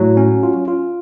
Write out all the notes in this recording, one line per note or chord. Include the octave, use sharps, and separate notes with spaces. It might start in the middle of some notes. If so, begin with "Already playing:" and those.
Already playing: A2 F#3
C#4
F4
F4